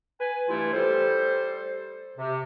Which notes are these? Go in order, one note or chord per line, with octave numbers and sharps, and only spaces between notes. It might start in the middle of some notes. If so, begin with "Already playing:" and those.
B4 G#5
G2 E3 A3 E4 F4
G3 A4 C5
C3